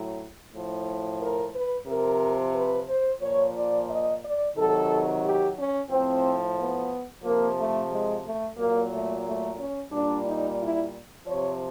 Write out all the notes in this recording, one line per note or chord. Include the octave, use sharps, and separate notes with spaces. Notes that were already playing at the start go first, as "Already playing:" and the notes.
Already playing: A2 F#3
A2 F3
A#4
B4
C3 F3 A#4
B4
C5
A#2 F3 C#5
D5
D#5
D5
C3 D#3 F#3 A4
G4
C#4
A2 F3 C4
B3
C3 F3 A#3
A3
G#3
A3
A#2 F#3 A#3
A3
A3
C#4
A#2 G3 D4
D#4
E4
C3 F3 C#5